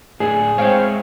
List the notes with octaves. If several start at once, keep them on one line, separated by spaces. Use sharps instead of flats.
A2 D4 G#4
G#3 C4 E4 C#5 F5 G5